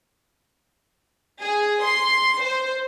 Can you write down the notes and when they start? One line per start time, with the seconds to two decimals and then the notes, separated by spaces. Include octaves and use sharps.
1.42 G#4
1.84 C6
2.42 C5